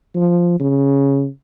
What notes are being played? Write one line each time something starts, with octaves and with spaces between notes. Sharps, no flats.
F3
C#3